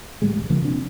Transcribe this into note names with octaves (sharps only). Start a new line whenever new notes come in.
A2 G3 G#3
E1 B1
C#3 F3 A#3
C3 D4